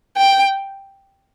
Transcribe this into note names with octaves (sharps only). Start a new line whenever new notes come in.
G5